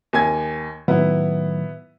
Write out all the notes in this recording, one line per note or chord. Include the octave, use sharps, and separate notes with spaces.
D#2 G#5 G#6
A2 D#3 F#3 B3 E4